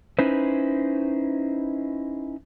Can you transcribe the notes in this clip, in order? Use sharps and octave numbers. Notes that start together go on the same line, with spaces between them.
C#4 D#4 E4 B4 C5